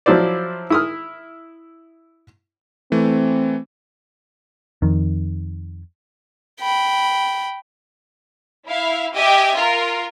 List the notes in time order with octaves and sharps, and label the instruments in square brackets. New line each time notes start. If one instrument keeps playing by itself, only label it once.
[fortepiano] F3 F#3 E4 C5 D5
E4 D#6 F6
[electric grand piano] E3 A3 [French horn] C4
[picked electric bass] F2 D#3
[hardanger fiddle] G5 B5
[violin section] E4 E5 F5
G4 D#5 E5 G#5
F4 A#4